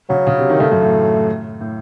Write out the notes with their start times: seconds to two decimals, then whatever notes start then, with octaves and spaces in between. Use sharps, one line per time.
0.09 C#3 F#3
0.27 C#3
0.38 C3
0.50 D#3
0.60 C#3 A3
0.72 F#2
0.82 A2
1.61 A2